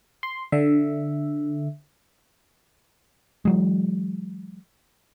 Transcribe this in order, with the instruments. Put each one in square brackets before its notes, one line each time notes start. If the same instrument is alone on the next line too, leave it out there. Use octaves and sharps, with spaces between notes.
[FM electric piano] C6
D3 E5
[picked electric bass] E3 F#3 G#3